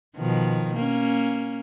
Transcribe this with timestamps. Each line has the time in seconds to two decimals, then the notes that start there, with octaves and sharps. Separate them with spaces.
0.16 B2 D#3 F3
0.76 A#3 C#4